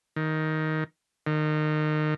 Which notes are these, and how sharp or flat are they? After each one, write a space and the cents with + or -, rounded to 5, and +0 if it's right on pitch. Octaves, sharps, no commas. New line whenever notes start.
D#3 +10
D#3 -25